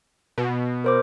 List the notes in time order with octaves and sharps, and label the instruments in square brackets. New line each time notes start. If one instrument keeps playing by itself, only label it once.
[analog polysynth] B2
[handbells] A#4 C5 D6